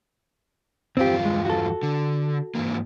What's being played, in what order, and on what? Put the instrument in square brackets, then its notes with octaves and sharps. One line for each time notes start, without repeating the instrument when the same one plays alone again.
[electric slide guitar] E2 G2 F4 [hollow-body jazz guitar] C4 G4
[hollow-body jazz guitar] G#3
F#4 A4
[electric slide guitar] D3
G#2 E3 A#3